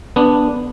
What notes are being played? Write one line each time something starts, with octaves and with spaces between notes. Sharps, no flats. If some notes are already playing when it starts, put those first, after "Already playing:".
B3 D4